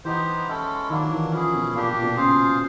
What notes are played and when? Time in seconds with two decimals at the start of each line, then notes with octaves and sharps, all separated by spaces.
0.05 E3 B3 D#4 G4 C5
0.48 G#3 C#4 E4 A4
0.90 D#3 F#3 A#3 D4
1.11 E3
1.32 F3 C#4 E4 G#4
1.54 B2
1.74 A#2 A#3 D4 G4
1.89 A#2
2.02 B2
2.17 C#3 F4 G#4 C5 F5